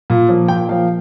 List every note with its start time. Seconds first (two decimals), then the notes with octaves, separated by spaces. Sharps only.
0.10 A#2
0.29 F3 A#3
0.48 A#2 G5
0.68 F3 A#3 F5